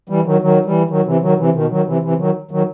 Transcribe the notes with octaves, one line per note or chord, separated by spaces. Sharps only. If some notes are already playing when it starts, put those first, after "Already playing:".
E3 G3
D#3 F#3
D#3 F#3
E3 G3
D#3 F#3
C3 E3
D#3 F#3
C3 E3
B2 D#3
D#3 F#3
C3 E3
C3 E3
D#3 F#3
D#3 F#3